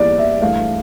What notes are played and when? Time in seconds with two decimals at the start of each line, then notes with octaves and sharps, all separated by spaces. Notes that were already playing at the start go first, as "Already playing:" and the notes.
Already playing: E2 E3 G3 A#3 D5
0.18 E5
0.41 G2 E3 A3 F5